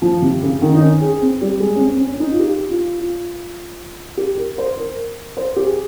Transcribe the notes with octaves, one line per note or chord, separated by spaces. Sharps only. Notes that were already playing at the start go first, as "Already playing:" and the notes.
F3
C3
C#3
D#3
D#4
C#4
G#4
C4
G3
G#3
C#4
C4
C4
C#4
C#4
D#4
F4
G4
F4
F4
G4
A#4
C5
A#4
C5
G4
G#4